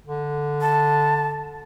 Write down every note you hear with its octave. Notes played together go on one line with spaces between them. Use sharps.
D3
A5